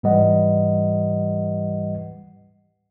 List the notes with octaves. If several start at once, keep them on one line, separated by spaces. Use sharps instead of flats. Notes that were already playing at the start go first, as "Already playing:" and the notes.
G#2 E3 G3 B4 D#5 F#5